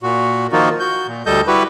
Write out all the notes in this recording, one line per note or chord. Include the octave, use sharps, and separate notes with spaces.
A#2 F#4
D#3 F3 A#3 D#4 F4 F#4
F#4 G6
A#2
D2 G3 A4 D#5 G6
G3 E4 F#4 G4 B4